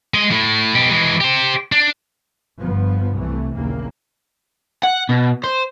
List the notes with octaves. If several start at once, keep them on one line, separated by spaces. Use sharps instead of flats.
G#3 D#5
A2
B2 G4
E3 G#3
G4 C5
D4
G1 G2 F3 B3
C2 C3 E3 A3
A#1 D#2 C#3 E3 A#3
F#5
B2
C5